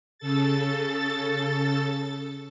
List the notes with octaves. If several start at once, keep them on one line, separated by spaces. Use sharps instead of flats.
C#3 A4 A6